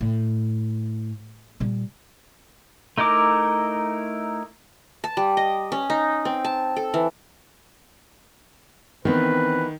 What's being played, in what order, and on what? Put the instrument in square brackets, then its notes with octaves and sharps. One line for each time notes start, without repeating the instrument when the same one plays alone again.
[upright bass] A2
A#2 G3
[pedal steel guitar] A3 D#4 E4 A#4 D6
[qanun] A5
G3
D#5
C#4
D#4
C4
A5
A4
E3
[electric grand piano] D#3 [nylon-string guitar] E3 B3 [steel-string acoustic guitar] C4 [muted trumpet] B4